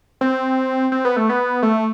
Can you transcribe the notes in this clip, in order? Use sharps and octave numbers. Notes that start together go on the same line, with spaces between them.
C4
C4
B3
A3
B3
A3